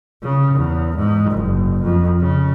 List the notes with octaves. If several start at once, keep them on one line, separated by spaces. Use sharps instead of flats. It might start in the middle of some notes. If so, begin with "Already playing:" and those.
C#3
E2
G#2
F#1
F2
C#3